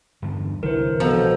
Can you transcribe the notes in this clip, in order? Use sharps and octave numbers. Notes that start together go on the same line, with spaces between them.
E2 G2 D3
C2 D3 E3 F#3 A#4 C5
B2 F3 A4 A#5